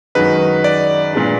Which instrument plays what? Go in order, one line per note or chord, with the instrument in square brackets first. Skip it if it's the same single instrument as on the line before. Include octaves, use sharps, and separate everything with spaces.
[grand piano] F#2 D#3 G#3 D#4 F#4 [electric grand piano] B4
[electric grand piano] D5
[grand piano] A#2 G#3 D4